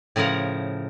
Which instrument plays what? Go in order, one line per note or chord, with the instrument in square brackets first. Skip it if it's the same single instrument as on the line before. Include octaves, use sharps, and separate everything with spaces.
[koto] A2 C#3 F3 A#4 F#5